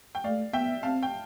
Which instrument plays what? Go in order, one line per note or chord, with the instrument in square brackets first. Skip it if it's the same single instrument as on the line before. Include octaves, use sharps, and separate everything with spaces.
[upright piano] G5
[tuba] A3 [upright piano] D5 F5
[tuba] B3 [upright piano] E5 G5
[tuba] C4 [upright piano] F5 A5
[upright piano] G5